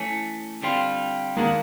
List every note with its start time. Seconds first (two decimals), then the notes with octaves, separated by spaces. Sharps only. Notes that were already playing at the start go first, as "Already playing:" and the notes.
Already playing: E3 A3 C#4
0.62 D3 G3 C4 F4
1.37 D#3 G#3 A#3 B3 D4 F#4